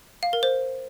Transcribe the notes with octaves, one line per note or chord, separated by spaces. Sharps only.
F5
A#4
C5